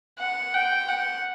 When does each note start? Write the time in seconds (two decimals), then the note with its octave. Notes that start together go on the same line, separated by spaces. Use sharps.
0.19 F#5
0.54 G5
0.89 F#5